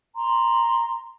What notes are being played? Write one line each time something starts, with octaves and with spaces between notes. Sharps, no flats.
A#5 C6